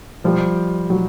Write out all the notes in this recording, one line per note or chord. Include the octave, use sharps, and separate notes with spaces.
F3 G3
F#3